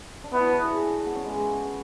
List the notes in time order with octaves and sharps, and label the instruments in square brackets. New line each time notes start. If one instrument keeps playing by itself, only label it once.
[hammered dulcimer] D4
[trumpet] B3 [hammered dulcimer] E4
[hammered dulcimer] F#4
A4
G#4
A4
B3
C#4
G#3